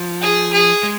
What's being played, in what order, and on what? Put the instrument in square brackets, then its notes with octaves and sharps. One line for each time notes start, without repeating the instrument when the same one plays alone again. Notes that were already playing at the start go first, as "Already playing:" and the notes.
Already playing: [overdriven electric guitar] F3
[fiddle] G#4
G#4
[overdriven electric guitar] G#3